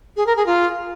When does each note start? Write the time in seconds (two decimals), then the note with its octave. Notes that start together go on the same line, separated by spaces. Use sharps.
0.17 G#4
0.27 A#4
0.36 G#4
0.46 F4